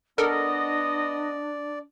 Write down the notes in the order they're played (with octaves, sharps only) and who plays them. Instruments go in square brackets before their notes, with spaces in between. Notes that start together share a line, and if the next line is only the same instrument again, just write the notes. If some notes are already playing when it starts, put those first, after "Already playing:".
[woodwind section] B3 D#5 [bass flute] D4 [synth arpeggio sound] A4 A#4 [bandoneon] D5